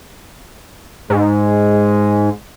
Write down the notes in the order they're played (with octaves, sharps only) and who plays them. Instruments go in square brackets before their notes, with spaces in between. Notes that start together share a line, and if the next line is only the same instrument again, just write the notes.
[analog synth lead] G#2 [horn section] G#3